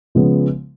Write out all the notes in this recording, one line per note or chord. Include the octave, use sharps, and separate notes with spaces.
C#3 F3 G#3 B3